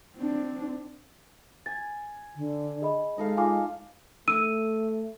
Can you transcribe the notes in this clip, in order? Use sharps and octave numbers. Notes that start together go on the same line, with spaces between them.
C4 D4
G#5 A6
D3
G#4 D#5 B5
G#3 D#4 A4 F5
D#4 F4 G#5 D6
A3 E6 D#7